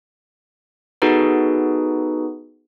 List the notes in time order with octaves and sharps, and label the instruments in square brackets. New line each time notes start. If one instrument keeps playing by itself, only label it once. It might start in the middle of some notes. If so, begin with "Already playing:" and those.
[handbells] B3 D#4 F#4 G#4 A4 B4